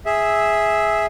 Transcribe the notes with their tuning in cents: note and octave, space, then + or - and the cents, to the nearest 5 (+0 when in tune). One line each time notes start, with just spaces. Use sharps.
G#4 +0 E5 -10 E6 -15